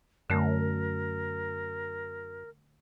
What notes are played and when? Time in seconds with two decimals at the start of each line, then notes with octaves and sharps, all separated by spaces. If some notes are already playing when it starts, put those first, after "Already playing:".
0.30 F#2 D3 A3 A#4